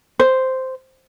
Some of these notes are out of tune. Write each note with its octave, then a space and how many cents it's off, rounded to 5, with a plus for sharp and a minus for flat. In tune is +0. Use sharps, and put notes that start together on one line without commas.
C5 -5